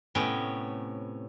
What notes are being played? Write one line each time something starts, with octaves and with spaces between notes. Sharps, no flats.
A2 C3 B3 C#4 G5